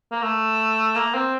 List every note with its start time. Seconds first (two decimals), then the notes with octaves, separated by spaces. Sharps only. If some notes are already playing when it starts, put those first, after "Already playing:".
0.12 A#3
0.22 A3
0.95 A#3
1.14 C4